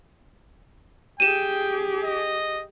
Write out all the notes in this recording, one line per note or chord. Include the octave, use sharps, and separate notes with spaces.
G4 G#4 G5 D#7 E7
D#5